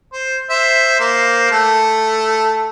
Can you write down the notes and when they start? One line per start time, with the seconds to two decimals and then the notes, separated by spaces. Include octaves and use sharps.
0.13 C5
0.50 C5 E5
1.00 A#3 C5
1.51 A3 A4